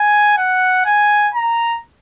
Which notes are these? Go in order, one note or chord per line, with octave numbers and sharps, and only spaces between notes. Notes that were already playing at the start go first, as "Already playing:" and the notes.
Already playing: G#5
F#5
G#5
A#5